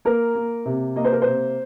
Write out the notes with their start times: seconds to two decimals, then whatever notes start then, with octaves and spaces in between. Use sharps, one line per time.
0.05 A#3 A#4
0.35 A#3
0.65 C3
0.96 A#3 D#5
1.05 C5
1.13 A#4
1.22 C3 C5